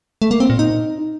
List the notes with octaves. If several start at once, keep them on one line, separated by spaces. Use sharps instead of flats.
A3
A#3
C4
A#2
D#4